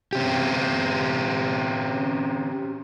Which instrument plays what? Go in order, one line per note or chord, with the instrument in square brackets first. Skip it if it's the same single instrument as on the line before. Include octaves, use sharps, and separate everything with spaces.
[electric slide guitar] C4 C#4 G4